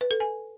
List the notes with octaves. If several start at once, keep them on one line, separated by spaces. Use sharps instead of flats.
B4
A4
G#5